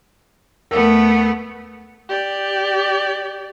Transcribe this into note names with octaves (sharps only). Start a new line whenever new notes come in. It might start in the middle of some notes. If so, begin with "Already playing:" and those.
D#2 A3 B3 A#4 E6
G4 D5